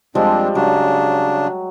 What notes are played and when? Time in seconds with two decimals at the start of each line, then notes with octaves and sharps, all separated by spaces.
0.15 F2 F3 G3 G#3 C4 D4
0.55 C#3 F#3 D4